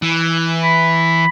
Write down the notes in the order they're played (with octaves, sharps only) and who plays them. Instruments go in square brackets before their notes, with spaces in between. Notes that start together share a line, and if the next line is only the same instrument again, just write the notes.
[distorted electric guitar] E3
[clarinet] B5